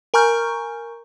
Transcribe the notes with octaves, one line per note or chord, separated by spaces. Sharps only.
A#4 G#5 A#5 C#6 F6 G6